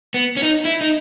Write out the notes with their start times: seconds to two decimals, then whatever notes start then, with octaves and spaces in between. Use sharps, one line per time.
0.14 B3
0.37 C#4
0.43 D#4
0.65 E4
0.81 D#4